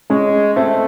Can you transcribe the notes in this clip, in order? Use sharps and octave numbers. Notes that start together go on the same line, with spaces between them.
G#3 C#4
A3 C4